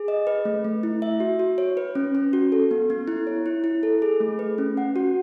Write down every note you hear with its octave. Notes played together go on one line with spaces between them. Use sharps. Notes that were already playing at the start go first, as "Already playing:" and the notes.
Already playing: G#4
D#5
B4
A3
A3
E4
E5
F#4
F#4
C#5
B4
C#4
C#4
F#4
A4
B3
B3
E4
C#5
E4
E4
A4
G#4
A3
B4
C#4
F#5
F#4